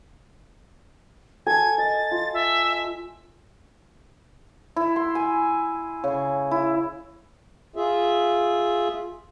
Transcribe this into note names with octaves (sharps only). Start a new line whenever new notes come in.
A4 G#5 G#6
D#5 A6
F4
E5
E4
C6
G#5
C#3
E4
F4 G#4 E5